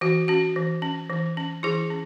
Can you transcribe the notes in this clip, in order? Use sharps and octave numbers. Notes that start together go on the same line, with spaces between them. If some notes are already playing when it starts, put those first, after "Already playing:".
E3 F#4
C#4 F#4
E3
C#4
E3
C#4
E3 E4 G#4
C#4